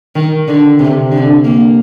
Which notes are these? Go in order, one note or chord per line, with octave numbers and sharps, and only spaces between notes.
D#3
D3
C3
D3
A#3